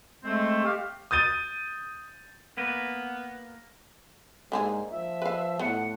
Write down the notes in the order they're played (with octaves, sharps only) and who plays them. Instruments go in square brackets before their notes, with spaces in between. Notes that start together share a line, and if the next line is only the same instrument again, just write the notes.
[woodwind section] G#3 A3 C4
G4 F5
[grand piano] D#6 G6 A6 D#7
[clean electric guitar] A#3 B4 [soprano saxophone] B3
[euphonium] G#2 [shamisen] D3 A#3 G#4
[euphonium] F3 [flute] E5
[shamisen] B4 F5
[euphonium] A2 [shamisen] B3 [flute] F#5